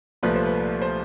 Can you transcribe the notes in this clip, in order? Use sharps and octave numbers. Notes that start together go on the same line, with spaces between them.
C2 A#2 F3 A3 B4
C5
B4
C5